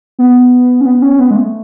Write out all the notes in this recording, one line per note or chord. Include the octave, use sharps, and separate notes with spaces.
B3
C#4
B3
C#4
B3
G#3
A3